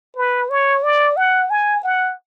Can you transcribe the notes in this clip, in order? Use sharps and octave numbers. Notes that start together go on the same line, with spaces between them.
B4
C#5
D5
F#5
G#5
F#5